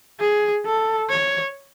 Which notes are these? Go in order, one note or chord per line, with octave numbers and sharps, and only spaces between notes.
G#4
A4
C#5